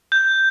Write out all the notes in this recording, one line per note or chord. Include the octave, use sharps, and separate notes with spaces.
G6